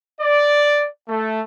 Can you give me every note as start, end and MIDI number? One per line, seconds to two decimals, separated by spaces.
0.21 0.87 74
1.09 1.41 57